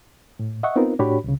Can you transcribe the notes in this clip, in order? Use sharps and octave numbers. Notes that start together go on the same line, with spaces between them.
A2
D#5 E5 F#5 C#6
B3 C4 D#4 F4 A#4
A2 D4 F#4 G4 C#5 B5
C2 C#3